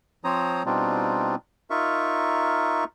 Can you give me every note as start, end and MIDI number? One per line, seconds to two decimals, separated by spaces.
0.24 0.63 53
0.24 0.63 60
0.24 0.63 72
0.24 0.63 73
0.24 0.63 82
0.24 0.63 87
0.66 1.35 47
0.66 1.35 55
0.66 1.35 60
0.66 1.35 62
0.66 1.35 63
0.66 1.35 65
1.70 2.84 63
1.70 2.84 65
1.70 2.84 70
1.70 2.84 76
1.70 2.84 85